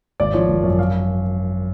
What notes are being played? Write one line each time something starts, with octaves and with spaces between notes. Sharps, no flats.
G#1 D5
F3 C#5
G#1
F#2
F5